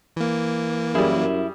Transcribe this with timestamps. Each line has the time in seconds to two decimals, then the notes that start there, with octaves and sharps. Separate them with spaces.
0.17 E3 A#3
0.95 F#2 G3 E4 G#4